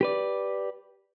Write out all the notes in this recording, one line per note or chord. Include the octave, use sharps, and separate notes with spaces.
G4 B4 D5